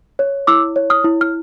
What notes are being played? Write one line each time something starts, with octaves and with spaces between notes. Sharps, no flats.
C#5
E4 D6 E6
C#5
D#6 F6
E4
F6